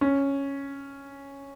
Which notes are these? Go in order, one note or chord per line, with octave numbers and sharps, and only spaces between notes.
C#4